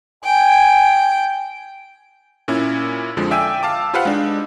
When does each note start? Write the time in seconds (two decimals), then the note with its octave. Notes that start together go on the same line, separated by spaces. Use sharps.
0.24 G5 G#5
2.48 A#2 C#4 E4
3.17 F2 D3 F3 G#3
3.31 D5 E5 G5 G#5 E6
3.63 F5 A5 D6
3.93 F4 G4 B4 C5 F5 F#5
4.05 G#3 D4 D#4